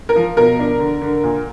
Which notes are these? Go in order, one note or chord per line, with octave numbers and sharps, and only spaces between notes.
A#4
F3
B2 A#4
D4
D3
D3
A#2